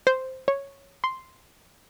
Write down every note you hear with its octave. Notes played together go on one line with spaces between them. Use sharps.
C5
C#5
C6